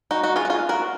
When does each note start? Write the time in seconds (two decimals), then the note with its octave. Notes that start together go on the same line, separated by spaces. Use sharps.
0.11 D#4 F#4
0.24 D#4 F#4
0.36 F4 G#4
0.45 F#4
0.50 F4 G#4
0.69 F#4 A#4